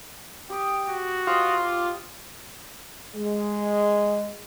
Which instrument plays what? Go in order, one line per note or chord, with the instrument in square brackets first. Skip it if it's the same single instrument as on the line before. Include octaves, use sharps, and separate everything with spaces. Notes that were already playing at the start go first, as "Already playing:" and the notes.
[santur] G4 D#6 [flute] G5
[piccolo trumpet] F#4
[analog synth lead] F4 [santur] G4 C5 D#5 [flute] D#6
[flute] D6
[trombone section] G#3